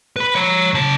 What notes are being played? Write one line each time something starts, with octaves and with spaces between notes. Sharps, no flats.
B4 B5
C#5 A#5
C#3 A5